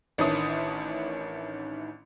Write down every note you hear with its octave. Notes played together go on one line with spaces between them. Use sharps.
A1 D#3 C#4 D4 E4 D#6